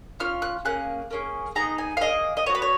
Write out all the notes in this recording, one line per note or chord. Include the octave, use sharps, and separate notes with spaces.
C#4 F4 F6
F#6
A#3 C#4 G#4 F#6
A#3 C#4 G#4
B3 D#4 G#4 A#5
G#5
F5
A#3 C#4 G#4 D#5
D#5
B3 F#4 C#5
B4
C#5